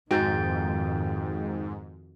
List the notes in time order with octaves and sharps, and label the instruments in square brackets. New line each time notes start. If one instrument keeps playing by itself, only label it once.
[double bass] F2 D#3 [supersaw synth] G#2 [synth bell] F#4 [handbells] G5 G6 A6